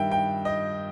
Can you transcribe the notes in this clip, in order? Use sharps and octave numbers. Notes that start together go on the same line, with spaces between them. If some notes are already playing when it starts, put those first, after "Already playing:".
Already playing: G2 D#3 E5 G5
G5
D#5